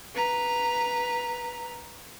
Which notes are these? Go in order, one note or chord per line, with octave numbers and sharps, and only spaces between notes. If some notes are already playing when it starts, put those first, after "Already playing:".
B4 A#5